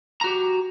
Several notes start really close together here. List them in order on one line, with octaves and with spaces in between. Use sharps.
A#5 F#4 G4